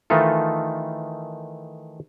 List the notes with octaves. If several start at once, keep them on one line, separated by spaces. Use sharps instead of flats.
D#3 E3 A3 D#4 F4 A4